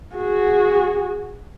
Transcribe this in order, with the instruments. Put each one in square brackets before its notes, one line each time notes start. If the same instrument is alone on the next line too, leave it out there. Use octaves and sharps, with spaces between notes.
[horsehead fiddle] F#4 G#4